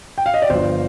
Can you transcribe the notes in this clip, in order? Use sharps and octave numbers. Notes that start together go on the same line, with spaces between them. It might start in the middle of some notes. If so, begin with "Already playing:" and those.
G5
F5
D#5
D5
G1 G2 F3 C5